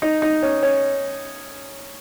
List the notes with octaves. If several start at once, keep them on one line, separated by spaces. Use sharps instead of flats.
D#4
D#4
C#4
C#4